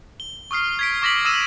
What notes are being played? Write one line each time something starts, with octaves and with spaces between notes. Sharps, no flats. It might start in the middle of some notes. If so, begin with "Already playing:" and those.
G7
C#6 D#6 F6 C7
G#6 B6 D7
C#6 D6 A#6 B6 F#7
D#6 E6 A#6 D#7 E7